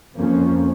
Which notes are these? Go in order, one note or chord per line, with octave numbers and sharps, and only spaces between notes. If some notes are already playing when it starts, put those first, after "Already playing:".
F2 F3 A#3 C#4